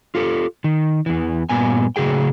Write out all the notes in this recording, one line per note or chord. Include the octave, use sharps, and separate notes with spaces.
F4 G4 A4
D#3
E2 E3
G2 A#2 B3 G#5
A2 C#3 F#4 G#4 G5